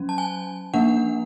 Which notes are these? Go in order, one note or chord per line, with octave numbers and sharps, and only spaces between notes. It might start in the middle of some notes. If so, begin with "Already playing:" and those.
Already playing: F#3 C#4
A5
G#5
F3 A#3 D4 F#5